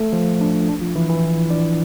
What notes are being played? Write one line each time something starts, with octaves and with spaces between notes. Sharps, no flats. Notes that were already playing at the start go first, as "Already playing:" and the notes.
Already playing: A3 A4
F3 F4
D4
D4
F3 F4
E3 E4
E3 E4
D4 D5